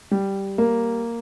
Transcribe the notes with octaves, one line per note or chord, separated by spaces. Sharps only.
G3
A#3